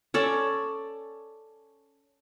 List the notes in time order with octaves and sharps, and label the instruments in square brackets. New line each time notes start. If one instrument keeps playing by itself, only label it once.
[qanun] C#4 A4 D5